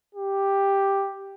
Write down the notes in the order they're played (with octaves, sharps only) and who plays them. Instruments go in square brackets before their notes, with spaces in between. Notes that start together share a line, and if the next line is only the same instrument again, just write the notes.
[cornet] G4